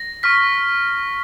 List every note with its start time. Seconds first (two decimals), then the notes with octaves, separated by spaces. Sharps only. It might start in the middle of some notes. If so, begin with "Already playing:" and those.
Already playing: A#6
0.23 C#6 F6 B6